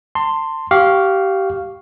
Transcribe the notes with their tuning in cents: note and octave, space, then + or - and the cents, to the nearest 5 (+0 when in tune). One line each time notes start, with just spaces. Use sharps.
A5 +30 C6 +0
G4 -20 F5 +0 C#6 +0